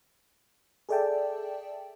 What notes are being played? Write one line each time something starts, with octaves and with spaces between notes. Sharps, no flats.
G#4 A4 D5 E5 G5 A5